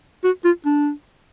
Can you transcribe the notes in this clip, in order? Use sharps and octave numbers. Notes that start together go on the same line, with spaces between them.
F#4
F4
D4